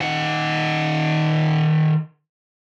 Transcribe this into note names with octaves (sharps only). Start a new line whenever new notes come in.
D#3 F#5